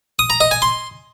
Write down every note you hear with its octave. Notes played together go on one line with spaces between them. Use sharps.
D#6
A#5
D#5
G#5
C6